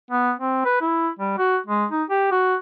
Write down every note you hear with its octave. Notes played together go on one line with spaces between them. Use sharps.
B3
C4
B4
E4
G3
F#4
G#3
D#4
G4
F#4